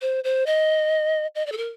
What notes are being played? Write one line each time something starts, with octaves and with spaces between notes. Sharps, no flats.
C5
C5
D#5
D#5
D5
A4
A#4